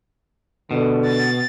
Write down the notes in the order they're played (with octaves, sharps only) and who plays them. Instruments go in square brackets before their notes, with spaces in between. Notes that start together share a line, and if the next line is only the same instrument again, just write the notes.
[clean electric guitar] B2 [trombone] D3
[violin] A6